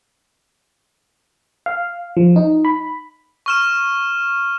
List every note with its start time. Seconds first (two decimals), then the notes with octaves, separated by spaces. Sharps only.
1.66 F5
2.17 F3
2.36 D#4
2.65 B5
3.46 C#6 F6 E7